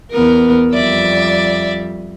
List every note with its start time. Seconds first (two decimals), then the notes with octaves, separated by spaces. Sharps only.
0.12 E2 B3 A#4
0.73 F2 G3 D5 E5